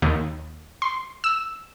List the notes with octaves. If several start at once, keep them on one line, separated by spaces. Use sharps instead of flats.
D#2
C6
E6